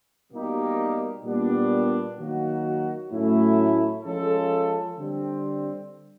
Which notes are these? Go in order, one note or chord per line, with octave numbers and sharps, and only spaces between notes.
B2 G3 A#3 D#4 G4
A#2 G3 B3 D4
D#3 F#3 A#3 D#4 F#4
A2 F#3 A3 C#4 E4
F3 G#3 C#4 F4 A4
D3 G3 C4